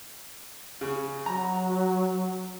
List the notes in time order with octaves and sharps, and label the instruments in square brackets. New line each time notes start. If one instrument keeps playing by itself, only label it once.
[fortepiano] C#3
[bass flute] F#3 [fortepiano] A#5